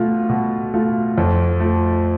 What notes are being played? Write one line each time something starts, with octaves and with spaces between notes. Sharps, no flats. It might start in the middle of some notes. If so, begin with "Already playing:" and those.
Already playing: B2 A3 F4
B2
A3 F4
F2
F3 A3